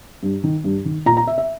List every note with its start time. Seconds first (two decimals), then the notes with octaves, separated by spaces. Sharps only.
0.23 G2
0.44 D#3
0.64 G2
0.85 D#3
1.06 A#2 A#5
1.17 A#5
1.27 E5
1.38 E5